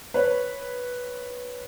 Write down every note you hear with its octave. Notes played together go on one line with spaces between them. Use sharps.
B4 C#5